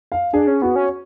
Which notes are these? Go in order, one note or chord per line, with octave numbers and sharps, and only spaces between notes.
F5
D4 G#4
C#4
B3 F#4
C#4